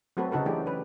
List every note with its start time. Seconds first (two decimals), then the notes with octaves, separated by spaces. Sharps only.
0.17 F#3 A3 C4 F#4 A4 B4
0.32 C#3 D#4 F#4 A4 B4
0.46 E3 A3 D4 E4 G4 G#4
0.66 C#4 B4